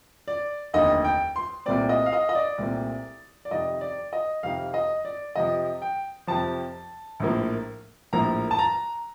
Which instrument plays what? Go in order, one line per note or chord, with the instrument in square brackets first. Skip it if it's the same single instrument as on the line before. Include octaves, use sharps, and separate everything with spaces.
[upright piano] D5
F1 D#2 D3 A3 D#5
G5
C6
C2 A#2 A3 C4 D5
D#5
F5
D#5
D#5
D5
C2 A#2 A3 C4
D5
F2 C3 D#3 D#5
D5
D#5
F2 C3 D#3 F5
D#5
D5
F2 C3 F3 D#5
G5
F2 C3 F3 A5
A#1 A2 F3 A#3
A#1 A2 F3 A#3 A#5
A5
A#5